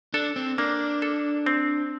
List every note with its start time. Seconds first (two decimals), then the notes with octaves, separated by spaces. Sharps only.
0.14 D4 A4
0.36 C4
0.58 A#3 D4
1.02 A4
1.46 C4